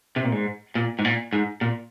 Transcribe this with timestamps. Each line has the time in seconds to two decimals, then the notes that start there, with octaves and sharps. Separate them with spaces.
0.16 C3
0.24 A#2
0.32 G#2
0.75 A#2
0.99 G#2
1.05 A#2
1.33 G#2
1.61 A#2